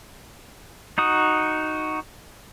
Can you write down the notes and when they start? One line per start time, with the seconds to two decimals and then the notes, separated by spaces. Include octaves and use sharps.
0.98 D#4 F#4 D#6